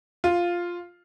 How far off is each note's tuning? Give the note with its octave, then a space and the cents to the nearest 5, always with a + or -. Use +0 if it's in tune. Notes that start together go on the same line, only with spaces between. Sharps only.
F4 +0